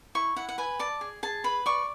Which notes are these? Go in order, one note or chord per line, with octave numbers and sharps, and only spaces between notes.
E4 C#6
E4 F#5
F#5
B4 G#5
D5 A5
G#4
G#4 A5
B4 B5
D5 C#6